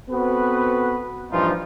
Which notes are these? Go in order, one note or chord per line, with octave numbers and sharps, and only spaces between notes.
B3 C4 F#4 A4 B4
G2 A#2 E3 F3 D#4 F4